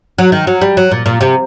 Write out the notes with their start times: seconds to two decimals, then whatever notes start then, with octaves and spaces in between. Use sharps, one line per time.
0.18 F#3
0.32 D#3
0.47 F#3
0.61 G3
0.77 F#3
0.91 A#2
1.06 A#2
1.21 C3